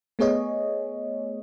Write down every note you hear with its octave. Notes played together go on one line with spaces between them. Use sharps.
A3 B3 G#4 C#5 D#5